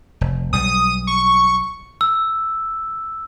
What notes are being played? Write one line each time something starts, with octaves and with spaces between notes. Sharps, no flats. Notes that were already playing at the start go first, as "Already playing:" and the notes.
F1
B1 G3 D#6
C#6
E6